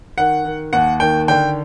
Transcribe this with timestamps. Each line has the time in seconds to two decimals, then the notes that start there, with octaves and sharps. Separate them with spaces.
0.18 D#3 F#5
0.45 D#3
0.73 D#2 F#5
1.00 D#3 G5
1.28 D3 G5